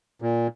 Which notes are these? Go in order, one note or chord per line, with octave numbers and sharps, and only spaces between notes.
A#2